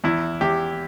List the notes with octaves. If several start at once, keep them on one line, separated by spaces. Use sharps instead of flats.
E2 E4
E2 G4